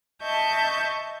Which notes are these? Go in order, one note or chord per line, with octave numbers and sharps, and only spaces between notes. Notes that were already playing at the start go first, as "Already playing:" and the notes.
D#5 E5 A5 C#6 G6